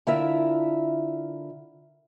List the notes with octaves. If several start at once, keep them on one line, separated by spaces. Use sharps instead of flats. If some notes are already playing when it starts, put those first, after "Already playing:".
D3 E4 F4 A#4 E5